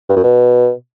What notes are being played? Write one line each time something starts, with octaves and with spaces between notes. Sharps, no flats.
G2
F#2
B2